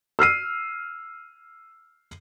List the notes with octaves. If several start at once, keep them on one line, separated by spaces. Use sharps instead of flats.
E6 F6 C7 D#7